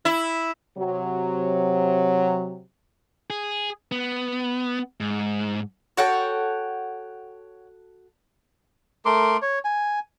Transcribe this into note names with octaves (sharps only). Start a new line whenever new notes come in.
E4
C3 F#3
G#4
B3
G#2
F#4 A4 C#5 F#5 G5
A3 A#4 C6 D6
C#5
G#5